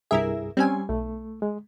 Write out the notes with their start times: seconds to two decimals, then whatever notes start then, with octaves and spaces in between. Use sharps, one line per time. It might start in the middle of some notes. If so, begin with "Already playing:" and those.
0.11 C2 G2 E4 G#4 A#4 E5
0.57 G3 C4 C#4 G#5
0.89 B1 A3
1.42 G#3